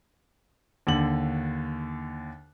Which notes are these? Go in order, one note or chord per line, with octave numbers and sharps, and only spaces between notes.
D#2 D3 F#7